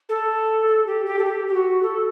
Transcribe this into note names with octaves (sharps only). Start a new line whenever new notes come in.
A4
A4
G4
G4
A4
G4
G4
F#4
A4